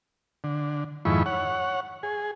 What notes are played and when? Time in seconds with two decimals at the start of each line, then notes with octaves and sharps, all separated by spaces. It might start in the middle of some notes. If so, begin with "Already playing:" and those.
0.44 D3
1.05 F2 G#2 D#3 E4 B5 C#6
1.26 C#5 F#5
2.03 G#4